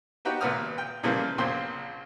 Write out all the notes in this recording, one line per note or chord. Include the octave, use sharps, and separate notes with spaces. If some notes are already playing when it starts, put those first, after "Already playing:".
B3 D#4 F#4 G4 B4
G#1 A#2 B3 B4 D#6 F6
G5
A#2 C#3 E3 F3 G3 A#3
A#1 F#2 A#2 C4 G5 C6